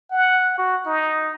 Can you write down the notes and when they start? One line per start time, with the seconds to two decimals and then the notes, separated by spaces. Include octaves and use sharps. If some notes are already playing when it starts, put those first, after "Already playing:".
0.11 F#5
0.58 F#4
0.86 D#4